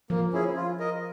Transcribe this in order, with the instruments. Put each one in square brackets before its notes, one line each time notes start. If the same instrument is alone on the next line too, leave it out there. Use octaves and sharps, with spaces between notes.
[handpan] F3 [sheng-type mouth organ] A#3
[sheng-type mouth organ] C#4 E4 G#4
F4
A#4 D#5